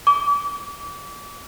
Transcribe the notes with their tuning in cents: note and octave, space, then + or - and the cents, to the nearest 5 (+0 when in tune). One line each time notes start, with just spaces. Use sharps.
D6 -35